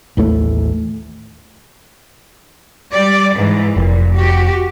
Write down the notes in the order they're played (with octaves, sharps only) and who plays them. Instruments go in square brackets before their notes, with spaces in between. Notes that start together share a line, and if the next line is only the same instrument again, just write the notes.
[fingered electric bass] A1 D#2 A2 A3
[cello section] G3 D5
G#2 E3
[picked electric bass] F1 [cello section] A#2
[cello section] F#4 G4